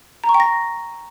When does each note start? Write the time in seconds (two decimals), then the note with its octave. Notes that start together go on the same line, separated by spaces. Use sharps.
0.24 A#5
0.29 C#6
0.34 G5
0.40 A#6